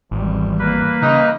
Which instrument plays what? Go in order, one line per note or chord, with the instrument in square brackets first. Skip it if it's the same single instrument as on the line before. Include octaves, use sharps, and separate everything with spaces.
[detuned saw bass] G#1 [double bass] E2 G3
[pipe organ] A#3 B4
[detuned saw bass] C#3 [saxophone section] D#4